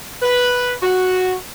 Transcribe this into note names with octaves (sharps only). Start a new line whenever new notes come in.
B4
F#4